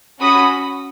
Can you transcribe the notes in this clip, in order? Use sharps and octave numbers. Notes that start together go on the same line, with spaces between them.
C#4 F#4 B5 D#6